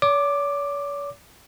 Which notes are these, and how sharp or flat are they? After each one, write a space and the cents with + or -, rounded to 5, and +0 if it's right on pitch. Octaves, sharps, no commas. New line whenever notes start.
C#5 +45 D6 +5